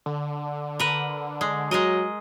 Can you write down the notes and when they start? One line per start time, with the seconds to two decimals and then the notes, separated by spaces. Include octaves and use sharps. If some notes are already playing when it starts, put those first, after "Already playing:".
0.06 D3
0.79 A#4 B4
1.41 G#3
1.71 F#3 G#3 A#4 D#5